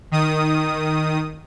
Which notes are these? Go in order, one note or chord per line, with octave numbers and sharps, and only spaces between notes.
D#3 D#6